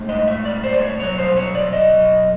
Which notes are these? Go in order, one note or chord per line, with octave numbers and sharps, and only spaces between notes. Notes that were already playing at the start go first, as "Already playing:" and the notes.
Already playing: A2 G#3
D#5
E5
D5
C5
D5
C#5
B2 F#3 C#5
C5
C#5
D5
D#5